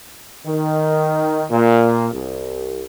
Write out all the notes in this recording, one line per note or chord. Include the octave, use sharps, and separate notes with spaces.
D#3
A#2
C2